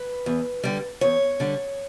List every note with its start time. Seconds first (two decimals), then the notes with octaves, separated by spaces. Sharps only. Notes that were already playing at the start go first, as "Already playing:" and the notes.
Already playing: B4
0.26 E2
0.64 D3 G3
1.01 E2 C#5
1.40 D3 G3